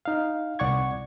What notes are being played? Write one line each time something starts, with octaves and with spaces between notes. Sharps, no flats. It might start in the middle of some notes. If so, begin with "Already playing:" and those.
D#4 F5
C2 D5 F#5 C#6 G#6